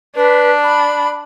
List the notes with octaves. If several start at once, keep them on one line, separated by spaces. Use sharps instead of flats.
D4 B4
B5